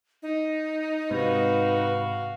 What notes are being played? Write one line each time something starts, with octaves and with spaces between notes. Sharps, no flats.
D#4
G#2 C3 F#4 B4 F5